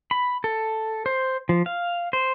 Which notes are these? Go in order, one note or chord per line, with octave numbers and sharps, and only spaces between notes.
B5
A4
C5
F3
F5
C5